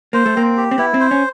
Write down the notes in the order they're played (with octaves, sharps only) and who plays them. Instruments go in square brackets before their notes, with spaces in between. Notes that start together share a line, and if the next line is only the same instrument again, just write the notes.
[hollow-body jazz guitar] A#3 [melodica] C5
[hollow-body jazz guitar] A3
[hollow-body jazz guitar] A#3 [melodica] C4
[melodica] G4
[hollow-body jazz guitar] C4
[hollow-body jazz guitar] B3 [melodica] E4
[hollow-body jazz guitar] C4
[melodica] C5
[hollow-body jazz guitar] C#4